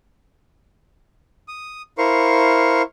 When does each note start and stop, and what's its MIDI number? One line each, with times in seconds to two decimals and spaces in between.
1.48 1.82 87
1.98 2.82 64
1.98 2.82 70
1.98 2.82 72
1.98 2.82 77
1.98 2.82 85